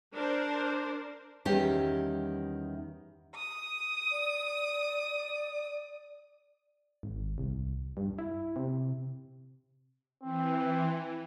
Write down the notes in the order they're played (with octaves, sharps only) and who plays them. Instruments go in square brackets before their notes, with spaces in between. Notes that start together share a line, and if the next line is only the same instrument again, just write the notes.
[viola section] D4 A#4 C5
[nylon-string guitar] E2 D#3 G3 C#4 G4
[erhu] D#6
[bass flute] D5
[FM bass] G#1
C2
G2
E4
C3
[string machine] E3 [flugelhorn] C4